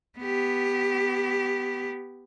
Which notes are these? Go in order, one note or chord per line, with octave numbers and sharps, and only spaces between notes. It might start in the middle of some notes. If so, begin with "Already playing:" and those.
B3 G4